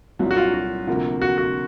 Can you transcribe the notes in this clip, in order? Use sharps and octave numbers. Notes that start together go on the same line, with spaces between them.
C2 A#2 F#3
F#4
F4
F#4
D2 C3 F3 A#3
F#4
F#4